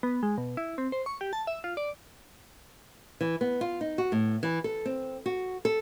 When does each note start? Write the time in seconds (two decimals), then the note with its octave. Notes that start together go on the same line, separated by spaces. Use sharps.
0.03 B3
0.23 G#3
0.38 B2
0.57 E4
0.78 C4
0.92 C5
1.06 C#6
1.21 G4
1.33 A5
1.47 E5
1.64 F4
1.77 D5
3.21 E3
3.41 B3
3.61 F4
3.81 D#4
3.98 F#4
4.12 A2
4.43 E3
4.64 A4
4.86 C4
5.26 F#4
5.65 A4